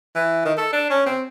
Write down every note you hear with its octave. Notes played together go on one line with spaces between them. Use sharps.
E3
D#3
A4
D4
C#4
C4